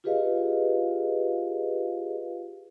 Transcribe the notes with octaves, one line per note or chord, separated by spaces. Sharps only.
F4 G4 G#4 B4 D#5 F5